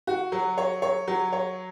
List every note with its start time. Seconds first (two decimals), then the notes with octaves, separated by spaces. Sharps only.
0.07 F#4
0.32 F#3
0.58 C#5
0.82 C#5
1.08 F#3
1.33 C#5